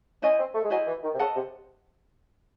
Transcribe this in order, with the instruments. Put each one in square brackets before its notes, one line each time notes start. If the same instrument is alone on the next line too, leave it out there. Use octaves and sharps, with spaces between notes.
[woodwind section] C#4 [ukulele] E4 C5 D#5 G#5
[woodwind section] C4
A3
G#3
[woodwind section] F#3 [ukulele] E4 C5 D#5 G#5
[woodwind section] E3
D#3
C3
[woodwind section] C#3 [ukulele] A4 D#5 F#5 A5
[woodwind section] C3